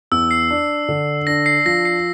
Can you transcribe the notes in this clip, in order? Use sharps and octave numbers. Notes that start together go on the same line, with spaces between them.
E2 E6
C7
D4
D3
D4 A#6
C7
F3 A#6
C7